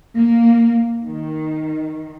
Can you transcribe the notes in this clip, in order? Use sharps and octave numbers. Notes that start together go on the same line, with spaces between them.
A#3
D#3